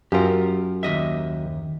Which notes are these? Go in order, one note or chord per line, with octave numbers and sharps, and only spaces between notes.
F#2 F4 G4 A#4
D#2 D#5 E5